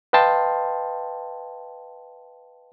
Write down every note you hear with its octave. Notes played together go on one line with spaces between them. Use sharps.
B4 D#5 F5 G5 A5 C6